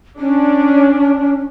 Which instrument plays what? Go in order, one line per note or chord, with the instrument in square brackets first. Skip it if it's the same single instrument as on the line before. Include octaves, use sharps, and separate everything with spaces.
[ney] C#4 [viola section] D4